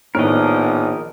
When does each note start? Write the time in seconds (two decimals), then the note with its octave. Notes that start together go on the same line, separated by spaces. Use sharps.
0.15 A#1 A2 D#3 B3 A#4 C#5 D#5